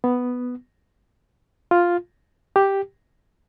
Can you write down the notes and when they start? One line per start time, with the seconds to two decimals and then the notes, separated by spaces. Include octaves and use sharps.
0.04 B3
1.71 F4
2.56 G4